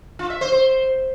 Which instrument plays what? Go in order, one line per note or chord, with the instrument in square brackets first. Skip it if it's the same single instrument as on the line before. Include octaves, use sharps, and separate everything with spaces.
[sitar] F4
E5
C5
C5